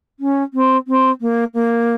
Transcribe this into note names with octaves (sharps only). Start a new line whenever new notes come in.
C#4
C4
C4
A#3
A#3